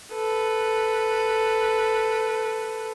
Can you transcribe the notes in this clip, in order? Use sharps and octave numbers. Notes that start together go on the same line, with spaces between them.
A4 B4